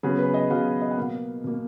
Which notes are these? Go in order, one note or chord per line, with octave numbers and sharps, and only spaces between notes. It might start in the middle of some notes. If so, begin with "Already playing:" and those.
C#3 F#3 B3 G#4
B4
D#5
C#3 F#3 B3 F5
D#5
F#5
B2 A#3 F5
B2 A#3